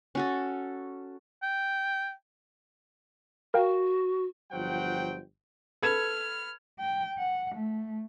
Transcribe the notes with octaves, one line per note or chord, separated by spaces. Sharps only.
C#4 F#4 A4
G5
F#4 A#4 F5 G5
G1 F3 F#3 C5 F#5 G5
A4 B4 F6 G#6
G5
F#5
A3